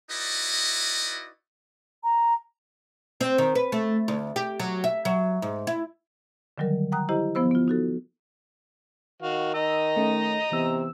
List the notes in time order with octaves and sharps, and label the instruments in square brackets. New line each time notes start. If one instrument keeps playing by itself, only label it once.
[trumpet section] D#4 E4 F#4 B4 D5 D#5
[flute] A#5
[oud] C4
D#3
B4
A3
D2
G4
F#3
E5
F#3
G#2
E4
[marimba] D3 D#3 F#3 G3 A#4
F#5 G5 A#5 D#6 F#6
E4 G4 C5 D#5 A#5
F3 B3 C5 E6
B3 F4
D#4 F#4 A4
[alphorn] D#3 [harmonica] F#4 F5
[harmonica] D#5 A#5 [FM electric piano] E6
[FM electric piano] A3 C#4
[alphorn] C3 [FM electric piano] E3 B3 E6